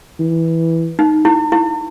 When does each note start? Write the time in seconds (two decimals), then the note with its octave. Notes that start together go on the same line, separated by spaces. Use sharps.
0.19 E3
0.99 D#4
1.25 E4
1.52 E4